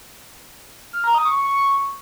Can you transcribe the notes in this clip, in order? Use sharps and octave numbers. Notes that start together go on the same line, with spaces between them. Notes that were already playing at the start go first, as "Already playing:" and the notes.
F6
A#5
D#6
C#6
C#6